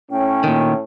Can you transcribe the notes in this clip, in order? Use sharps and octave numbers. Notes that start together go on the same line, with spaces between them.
A2 C#4 G5
A#2 D#3